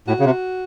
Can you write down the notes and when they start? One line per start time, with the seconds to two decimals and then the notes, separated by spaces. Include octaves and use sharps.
0.08 A2 F#4
0.20 C#3
0.26 C3